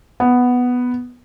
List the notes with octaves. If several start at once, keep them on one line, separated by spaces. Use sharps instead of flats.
B3